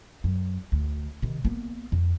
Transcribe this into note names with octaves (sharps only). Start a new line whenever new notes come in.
F#2
D2
C3 D#3
A#3 B3
F2